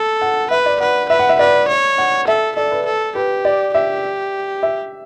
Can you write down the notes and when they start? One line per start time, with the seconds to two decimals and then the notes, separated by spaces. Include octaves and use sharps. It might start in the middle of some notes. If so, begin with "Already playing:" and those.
Already playing: A4
0.21 F#5
0.51 B4 E5
0.66 D5
0.80 B4 F#5
1.09 B4 E5
1.19 F#5
1.29 E5
1.39 B4 D5
1.68 C#5
1.98 F#5
2.27 A4 E5
2.56 A4 D5
2.71 B4
2.86 A4
3.15 G4 B4
3.45 D5
3.74 G4 E5
4.63 E5